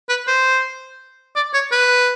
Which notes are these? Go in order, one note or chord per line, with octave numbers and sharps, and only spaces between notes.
B4
C5
D5
C#5
B4